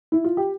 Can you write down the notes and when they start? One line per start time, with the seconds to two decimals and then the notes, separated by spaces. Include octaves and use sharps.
0.12 E4
0.24 F4
0.37 G4